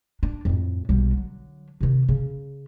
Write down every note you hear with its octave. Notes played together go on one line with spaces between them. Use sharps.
D4
F2 A2
B1 G3
D3 F#3
C3 D#3
C#3 C#4